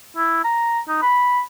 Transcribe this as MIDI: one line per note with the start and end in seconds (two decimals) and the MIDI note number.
0.17 0.42 64
0.44 0.80 82
0.88 1.01 63
1.02 1.42 83